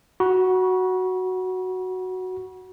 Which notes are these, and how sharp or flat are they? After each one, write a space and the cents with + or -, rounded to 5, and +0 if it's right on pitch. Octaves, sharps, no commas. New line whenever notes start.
F#4 +0 B5 -35